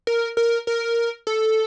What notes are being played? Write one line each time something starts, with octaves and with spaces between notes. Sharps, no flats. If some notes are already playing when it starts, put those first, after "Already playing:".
A#4
A#4
A#4
A4